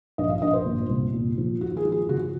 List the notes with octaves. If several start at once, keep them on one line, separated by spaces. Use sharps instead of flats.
A#1 D#5
F5
A#1 D#5
C5
A#2
C2
A#2
F3
D#2 F#4
G#4
F3
G#4
C#3 F#4